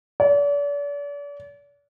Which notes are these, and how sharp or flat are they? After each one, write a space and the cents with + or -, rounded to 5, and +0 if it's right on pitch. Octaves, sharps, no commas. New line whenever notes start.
D5 -40